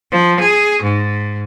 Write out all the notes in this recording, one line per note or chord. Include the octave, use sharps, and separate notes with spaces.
F3
G#4
G#2